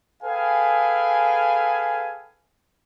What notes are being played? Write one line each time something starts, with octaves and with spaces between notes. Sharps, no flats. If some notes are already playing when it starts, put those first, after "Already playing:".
G#4 A4 B4 F5 G5 G#5